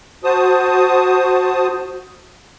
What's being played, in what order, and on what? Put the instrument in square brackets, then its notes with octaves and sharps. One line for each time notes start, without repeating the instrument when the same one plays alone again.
[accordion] F#4 C5 A5 D#6